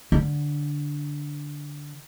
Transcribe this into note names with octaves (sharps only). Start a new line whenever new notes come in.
D3